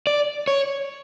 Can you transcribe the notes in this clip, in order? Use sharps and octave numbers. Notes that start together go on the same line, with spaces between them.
D5
C#5